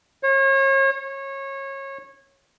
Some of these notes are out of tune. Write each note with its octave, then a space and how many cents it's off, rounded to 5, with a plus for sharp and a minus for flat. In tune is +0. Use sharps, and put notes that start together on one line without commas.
C#5 -35
C#5 -25